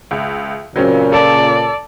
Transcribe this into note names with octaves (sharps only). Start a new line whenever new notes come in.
C#2 E5
A#2 C#3 F#3 C4 C#4
A4 D5 A5